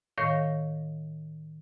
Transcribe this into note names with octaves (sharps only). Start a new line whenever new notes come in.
A2 D#3 C#5 F5 A#6